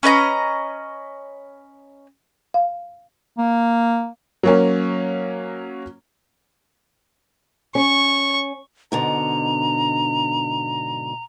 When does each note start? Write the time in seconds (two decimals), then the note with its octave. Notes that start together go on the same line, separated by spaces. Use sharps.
0.03 C#4 B4 D#5 A#5
2.54 F5
3.38 A#3
4.43 F#3 A#3 C#4
7.75 C#4 C#6
8.92 G#2 B2 D3 A#5